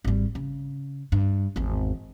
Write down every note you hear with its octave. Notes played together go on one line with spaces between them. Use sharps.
G#1 G3
C#3
G2
G#1 E2